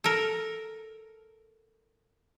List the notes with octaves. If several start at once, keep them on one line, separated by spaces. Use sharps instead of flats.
A4 A#4